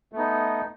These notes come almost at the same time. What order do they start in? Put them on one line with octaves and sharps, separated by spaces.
A3 B3 D#4